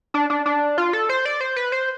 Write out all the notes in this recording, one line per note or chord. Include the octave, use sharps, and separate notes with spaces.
D4
D4
D4
F4
A4
C5
D5
C5
B4
C5